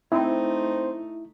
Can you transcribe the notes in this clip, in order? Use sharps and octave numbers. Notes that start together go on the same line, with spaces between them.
A3 C4 D#4 E4